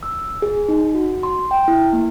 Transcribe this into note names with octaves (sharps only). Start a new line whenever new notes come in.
E6
G#4
D#4
F#4
C6
G5
E4
A#3